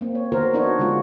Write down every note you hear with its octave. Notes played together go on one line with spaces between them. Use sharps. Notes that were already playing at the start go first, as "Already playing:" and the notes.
A#3 C4
C#5
D#3 B3 F#4 A#4 C5
B3 D4 D#4 F#4 C#5
D3 G#3 F4 F#4